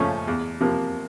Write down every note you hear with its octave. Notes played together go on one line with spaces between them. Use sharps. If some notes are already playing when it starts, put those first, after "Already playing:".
Already playing: D#2 C#3 F3 A3 C#4
E2
C3 F3 A#3